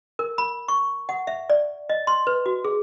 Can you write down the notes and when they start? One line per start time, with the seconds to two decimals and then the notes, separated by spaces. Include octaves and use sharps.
0.19 A#4
0.38 B5
0.68 C#6
1.09 F#5
1.27 E5
1.50 D5
1.89 D#5
2.07 C6
2.27 B4
2.46 F#4
2.65 G#4